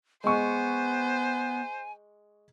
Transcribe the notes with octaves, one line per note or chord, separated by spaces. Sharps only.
G#3 B3 C5 G#5 C#6